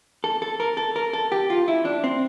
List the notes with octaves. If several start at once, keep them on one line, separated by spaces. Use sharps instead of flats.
A4
A4
A#4
A4
A#4
A4
G4
F4
E4
D4
C4